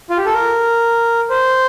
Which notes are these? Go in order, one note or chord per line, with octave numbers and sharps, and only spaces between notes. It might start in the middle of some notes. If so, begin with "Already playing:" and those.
F4
G4
A4
A#4
C5